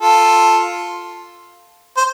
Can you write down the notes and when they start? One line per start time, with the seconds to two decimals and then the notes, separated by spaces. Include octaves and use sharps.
0.01 F4 A4
1.97 C5